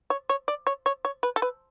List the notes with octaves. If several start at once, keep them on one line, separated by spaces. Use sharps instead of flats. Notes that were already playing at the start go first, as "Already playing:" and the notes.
C#5
C#5
D5
C#5
C#5
C#5
B4
A4
B4